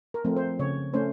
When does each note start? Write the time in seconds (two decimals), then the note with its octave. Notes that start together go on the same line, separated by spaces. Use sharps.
0.14 A#4
0.24 F3 A3 C4
0.37 C5
0.59 C#3 C#5
0.94 A3 C#4 C5